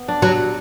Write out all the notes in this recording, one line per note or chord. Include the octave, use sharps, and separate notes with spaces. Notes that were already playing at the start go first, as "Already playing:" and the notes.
Already playing: B3
D4
F#3